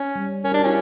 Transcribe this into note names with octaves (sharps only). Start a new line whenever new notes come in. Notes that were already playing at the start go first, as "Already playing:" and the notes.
Already playing: C#4
G3
C#4 A#4
D4 G4
F#4
C#4 E4